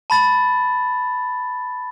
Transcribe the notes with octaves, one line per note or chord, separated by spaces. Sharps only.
A5 B5 A6